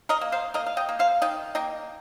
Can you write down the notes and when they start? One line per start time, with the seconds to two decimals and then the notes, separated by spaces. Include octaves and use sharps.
0.09 A#4 D#5
0.21 A#3
0.32 C5 F5
0.54 A#3 A#4 D#5
0.66 F5
0.77 D#5 G5
0.89 A#3
0.99 C5 F5
1.22 D#3 D#5 G5
1.55 A#3 D#5 G5